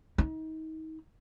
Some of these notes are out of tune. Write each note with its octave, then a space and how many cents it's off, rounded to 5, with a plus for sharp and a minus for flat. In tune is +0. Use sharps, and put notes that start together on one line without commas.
D#4 +30